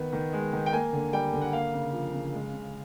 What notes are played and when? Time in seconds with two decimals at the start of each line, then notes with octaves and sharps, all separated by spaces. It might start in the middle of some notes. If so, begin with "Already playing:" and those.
Already playing: D#3 B3
0.13 D#3
0.33 G#3
0.53 D#3
0.66 G5
0.72 A#3 G#5
0.93 D3
1.13 G3 G5
1.33 D3
1.41 F#5
1.52 A#3 F5
1.73 C#3
1.93 F3
2.13 C#3
2.33 G#3
2.53 C#3